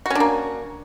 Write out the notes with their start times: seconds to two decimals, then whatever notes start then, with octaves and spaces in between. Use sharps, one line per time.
0.06 F#4
0.10 C#4
0.15 D4
0.20 A#3